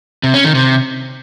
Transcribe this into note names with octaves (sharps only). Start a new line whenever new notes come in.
C3
C#4
D#3
C3